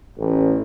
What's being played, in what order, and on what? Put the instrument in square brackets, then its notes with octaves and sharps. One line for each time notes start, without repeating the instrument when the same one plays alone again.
[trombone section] A1